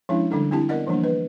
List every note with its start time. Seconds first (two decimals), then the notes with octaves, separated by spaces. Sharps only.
0.09 F3 G#3 C#4 D4 E4
0.31 D3 G3 A3 D4 A4
0.51 C4 D4 E4 G4 A5
0.69 B3 A#4 D5 D#5 F#5
0.87 E3 F3 G3 A#3 D4
1.04 B4 D#5